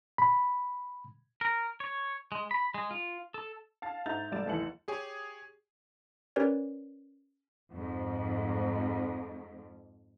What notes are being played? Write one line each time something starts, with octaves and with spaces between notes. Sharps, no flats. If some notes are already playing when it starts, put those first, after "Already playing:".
B5
A#4
C#5
G#3
B5
G#3
F4
A4
F5 A5 A6
G#2 E5 A#5 G6 A6 F7
F1 G3 D5 A6 E7
F1 D#2 E3 A5 C#7 F#7
G4 G#4 C#5 G#5
C#4 G4 A#4 B4 C#5 D5
F2 G#2